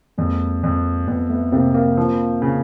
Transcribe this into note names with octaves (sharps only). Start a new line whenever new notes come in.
F2 G#3 A#3
F2
F2 A3 B3
A3 B3
C3 A#3 C4
A#3 C4
F3
C#3